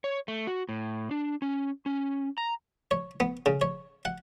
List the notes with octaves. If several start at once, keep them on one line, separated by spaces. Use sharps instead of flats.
C#5
A3
F#4
A2
D4
C#4
C#4
A#5
C#5
B3
C#3
C#5
F#5